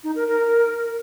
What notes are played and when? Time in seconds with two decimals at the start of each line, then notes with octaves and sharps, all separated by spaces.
0.04 D#4
0.16 A#4
0.28 A#4